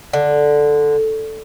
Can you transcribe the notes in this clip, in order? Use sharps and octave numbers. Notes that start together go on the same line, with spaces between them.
D3